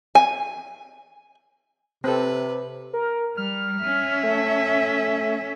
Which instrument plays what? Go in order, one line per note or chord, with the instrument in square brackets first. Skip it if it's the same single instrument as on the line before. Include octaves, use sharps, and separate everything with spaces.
[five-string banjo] G#5
[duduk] C3 [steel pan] C4 A4 [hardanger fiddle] B4
[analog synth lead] A#4
[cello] G3 [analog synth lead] F6
[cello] C#4 E5
[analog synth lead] A3